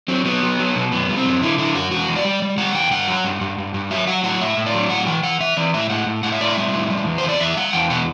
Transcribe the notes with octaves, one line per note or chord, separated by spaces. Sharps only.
F#3 C4
F#3 B3
F#3
F#3
B2
F#2 B3
G3
C4
F#2
D3 E4
D3 E4
F#2 F#4
E2 F#4
E2
D5
G3
G3
G3 F#5
E2 G5
G2 F#5
F#3
G2
G2
G2
G2
F#3 E5
F#3 F#5
A2 F#5
A2 E5
A2
D5
F#3
A2 F#5
E3 G5
E3 F#5
E3 E5
E3 D5
A2 E5
A2 F#5
A2
A2 F#5
E5
A2 D5
E5
G3
A2
G3
E2
E2 C5
D5
E2 E5
G3 F#5
E2 G5
B2 F#5